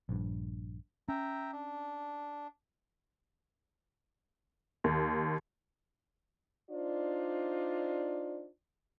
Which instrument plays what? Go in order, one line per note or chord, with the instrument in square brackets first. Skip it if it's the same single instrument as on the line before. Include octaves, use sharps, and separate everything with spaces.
[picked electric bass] A#1 G2
[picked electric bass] C#4 [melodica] E5 G5 A#5
[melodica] D4
[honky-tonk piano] D#2
[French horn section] D4 D#4 F4 C5 D5